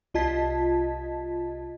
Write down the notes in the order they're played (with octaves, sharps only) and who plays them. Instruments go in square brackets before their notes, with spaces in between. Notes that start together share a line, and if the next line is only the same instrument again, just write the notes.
[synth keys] C2 F4 D#5 A5 G#6 B6